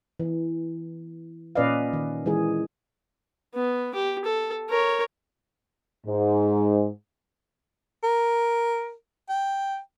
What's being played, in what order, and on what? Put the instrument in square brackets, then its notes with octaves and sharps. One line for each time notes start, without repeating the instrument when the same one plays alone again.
[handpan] E3
A#2 C#4 B4 D5 D#5 F5
D#3
E3 G#3 G#4
[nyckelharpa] B3
G4
A4
A#4 C#5
[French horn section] G#2
[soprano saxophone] A#4
G5